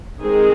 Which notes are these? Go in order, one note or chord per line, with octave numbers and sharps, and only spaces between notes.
D#3 G#3 C4 G#4